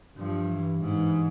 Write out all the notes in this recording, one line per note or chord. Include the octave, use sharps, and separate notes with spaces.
G2 F3
E3
G#2 E3